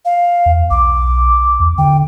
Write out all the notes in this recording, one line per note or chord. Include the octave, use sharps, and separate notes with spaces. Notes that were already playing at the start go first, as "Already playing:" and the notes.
F5
E2
B1 D6
E2
D3 G5